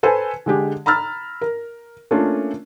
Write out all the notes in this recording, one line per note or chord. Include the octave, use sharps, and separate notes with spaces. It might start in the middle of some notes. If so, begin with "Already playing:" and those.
A4 B4 C5 G#5
D3 G#3 G4
A#5 B5 E6 F6 A6
A#4
A3 A#3 C#4 D4 F4